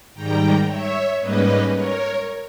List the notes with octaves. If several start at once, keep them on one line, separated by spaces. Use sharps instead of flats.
G#2 D#3 G3 G5 A#5
C#5 E5
G#2 G3 A#3 C#4 B4 D#5
A#4 C#5